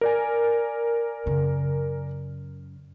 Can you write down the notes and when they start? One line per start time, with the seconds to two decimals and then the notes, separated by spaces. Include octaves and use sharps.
0.01 A#4 D5 G#5
1.26 F#2 C#3